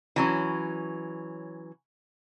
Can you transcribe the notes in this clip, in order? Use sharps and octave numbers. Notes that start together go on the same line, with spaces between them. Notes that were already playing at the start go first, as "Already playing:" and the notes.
E3 F#3 C#4